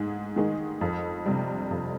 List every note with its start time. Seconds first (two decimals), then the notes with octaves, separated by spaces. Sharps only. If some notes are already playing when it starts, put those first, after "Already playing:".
Already playing: G#2 G#3
0.36 D#3 G#3 D#4
0.81 F2
1.26 C3 G3
1.71 F2